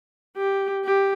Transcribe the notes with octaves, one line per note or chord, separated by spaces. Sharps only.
G4
G4